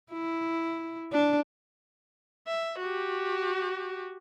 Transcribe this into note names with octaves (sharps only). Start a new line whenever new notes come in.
E4
D4
E5
F#4 G4